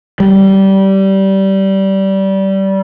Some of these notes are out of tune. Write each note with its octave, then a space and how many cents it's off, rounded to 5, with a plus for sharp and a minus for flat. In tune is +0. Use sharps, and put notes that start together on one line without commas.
G3 -20